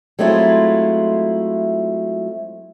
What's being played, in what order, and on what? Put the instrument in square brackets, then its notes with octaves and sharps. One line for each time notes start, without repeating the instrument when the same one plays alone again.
[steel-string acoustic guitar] F#3 G#3 A3 C4 E4 F4